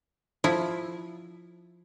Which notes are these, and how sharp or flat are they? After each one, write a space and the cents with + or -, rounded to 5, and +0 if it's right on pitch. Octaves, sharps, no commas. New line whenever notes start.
F3 +5 E4 +0